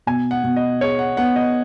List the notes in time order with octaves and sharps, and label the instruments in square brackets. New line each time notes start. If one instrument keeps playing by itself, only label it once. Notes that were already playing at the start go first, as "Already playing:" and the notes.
[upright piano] B2 [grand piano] G#5
[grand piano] F#5
[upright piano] B2
[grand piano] D#5
[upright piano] G#4 [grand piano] C#5
[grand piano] F#5
[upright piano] B3 [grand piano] F#5
[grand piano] D#5